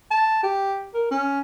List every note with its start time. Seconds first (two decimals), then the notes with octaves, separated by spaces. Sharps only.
0.11 A5
0.43 G4
0.94 A#4
1.11 C#4